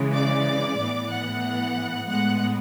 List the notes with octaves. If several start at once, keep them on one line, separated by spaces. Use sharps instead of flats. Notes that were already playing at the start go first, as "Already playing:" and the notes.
Already playing: C#3 E3 G#3
D5 D6
A2 E3 B3
F#5 F#6
A2 G#3 B3 F#5 F#6